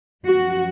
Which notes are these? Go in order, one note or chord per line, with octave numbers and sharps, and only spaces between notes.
F#2 F3 F#4